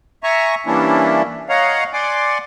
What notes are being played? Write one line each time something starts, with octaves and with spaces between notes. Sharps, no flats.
E5 G#5 A#5 C#6
E3 G3 A#3 C#4 D4 E4
C#5 D#5 F5 F#5 A#5
D5 F#5 G#5 C6 D6